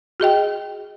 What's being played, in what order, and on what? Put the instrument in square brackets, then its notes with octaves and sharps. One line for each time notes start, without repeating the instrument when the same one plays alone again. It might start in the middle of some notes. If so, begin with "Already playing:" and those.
[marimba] F#4 G#4 D#5 G5